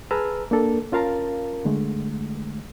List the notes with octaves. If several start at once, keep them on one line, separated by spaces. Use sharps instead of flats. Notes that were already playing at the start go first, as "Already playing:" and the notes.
G#4 B4 A5 A#5 E6 F6
A#3 D4 A4 A#4
C#4 F4 A#4 F5 A5 A#5
D3 G#3 A3